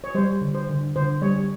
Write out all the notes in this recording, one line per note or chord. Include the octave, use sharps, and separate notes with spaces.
C#5
G3 C5
D3
C5
D3
D3 C5
G3 C#5